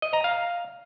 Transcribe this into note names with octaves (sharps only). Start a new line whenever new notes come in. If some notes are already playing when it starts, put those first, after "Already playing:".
D#5
A#5
F5